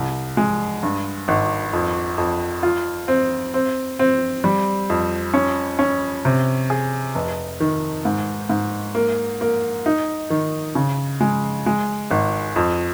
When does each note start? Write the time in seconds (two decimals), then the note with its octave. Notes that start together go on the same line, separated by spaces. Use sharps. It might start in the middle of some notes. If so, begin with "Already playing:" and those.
Already playing: C2
0.37 G#3
0.83 G2
1.28 G#1
1.73 F2
2.18 F2
2.63 F4
3.08 C4
3.54 C4
3.99 C4
4.44 G3
4.90 F2
5.34 C#4
5.79 C#4
6.25 C3
6.70 G#4
7.15 F1
7.60 D#3
8.05 G#2
8.49 G#2
8.95 A#3
9.41 A#3
9.86 D#4
10.30 D#3
10.75 C#3
11.21 G#3
11.66 G#3
12.11 G#1
12.56 F2